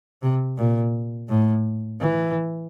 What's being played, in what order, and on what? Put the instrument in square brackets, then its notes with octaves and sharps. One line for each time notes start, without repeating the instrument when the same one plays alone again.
[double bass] C3
A#2
A2
E3